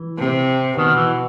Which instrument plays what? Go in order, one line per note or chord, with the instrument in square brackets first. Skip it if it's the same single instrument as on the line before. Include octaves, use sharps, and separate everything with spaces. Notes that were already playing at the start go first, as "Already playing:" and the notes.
Already playing: [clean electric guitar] E3
[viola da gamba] C3
[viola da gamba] B2 [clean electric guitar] D#3
[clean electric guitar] E3